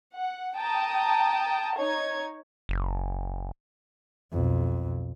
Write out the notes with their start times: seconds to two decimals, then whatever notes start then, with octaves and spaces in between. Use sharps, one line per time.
0.14 F#5
0.57 G5 A5 A#5 D#6
1.77 D#4 C#5 G#6
2.69 F#1
4.32 B1 F2